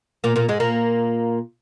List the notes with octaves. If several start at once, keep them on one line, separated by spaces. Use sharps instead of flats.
A#2 A#3
A#2 A#3
G#2 G#3
A#2 A#3